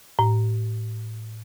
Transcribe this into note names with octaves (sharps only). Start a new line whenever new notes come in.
A2